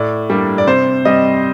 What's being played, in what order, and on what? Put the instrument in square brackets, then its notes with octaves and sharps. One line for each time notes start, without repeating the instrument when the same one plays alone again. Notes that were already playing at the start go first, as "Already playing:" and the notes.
Already playing: [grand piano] A2 D5
G3 A#3 D4
D5
C3 C5
G3 C4 D#5